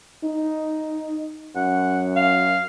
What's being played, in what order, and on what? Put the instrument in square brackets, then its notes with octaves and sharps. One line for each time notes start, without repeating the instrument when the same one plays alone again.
[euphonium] D#4
[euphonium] F#2 [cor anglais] F#5
[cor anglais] F5